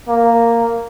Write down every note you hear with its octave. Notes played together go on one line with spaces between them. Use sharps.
A#3